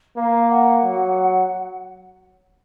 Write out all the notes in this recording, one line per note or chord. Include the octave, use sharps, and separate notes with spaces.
A#3 F5
F#5
F#3